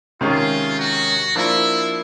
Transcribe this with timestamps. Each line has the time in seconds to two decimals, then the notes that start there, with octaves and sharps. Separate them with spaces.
0.21 C3 D#3 G#3 C#4 F4
0.78 F#4
1.35 F3 A#3 D4 E4 F4